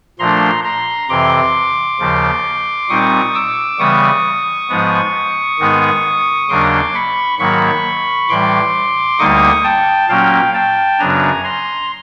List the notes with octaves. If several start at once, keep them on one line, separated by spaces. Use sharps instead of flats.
A#2 F3 A3 D4 A#5 C6
A#5 C6
F2 C3 E3 C6 D6
D#2 C#3 F3
A#2 G3 C4 D#4 C#6 D#6
D6 E6
C#3 E3 G3 B3 C#6 D#6
G#2 F3 G#3 B3
G#2 D#3 G#3 B3 D#4
D#2 C#3 F#3 A#3 D4 C6 D6
B5 C#6
G#2 D#3 F#3 A#3 B5 C#6
A2 E3 G3 C6 D6
D2 D3 G3 A#3 D#4 C#6 D#6
G5 A5
A#2 F#3 A#3 C#4 F5 G5
G5 A5
F#2 C#3 F#3 B3 D4 G#5 A#5
A#5 C6